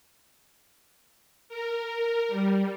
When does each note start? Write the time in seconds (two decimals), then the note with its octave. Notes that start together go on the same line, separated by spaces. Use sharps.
1.49 A#4
2.29 G3